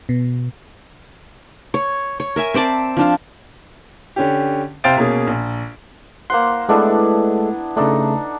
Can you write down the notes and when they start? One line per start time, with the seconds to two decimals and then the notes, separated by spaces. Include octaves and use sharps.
0.09 B2
1.74 C#5
2.20 C#5
2.36 A#4 E5 G#5
2.54 C4 C5 D5 A5
2.97 F3 D4 F4
4.16 D3 C#4 G4
4.84 C3 C5 F5 G5 A6 D7
4.97 B2 A#3 C#4 G#4
5.27 A#1
6.30 A#3 C5 F#5 C6
6.69 G#3 A3 B3 D4 E4 A4
7.77 C#3 A3 D4 D#4 A4